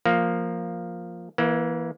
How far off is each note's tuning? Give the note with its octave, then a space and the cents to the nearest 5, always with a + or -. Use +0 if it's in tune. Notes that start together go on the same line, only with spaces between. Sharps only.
F3 +0 A#3 +0
E3 +0 A#3 +30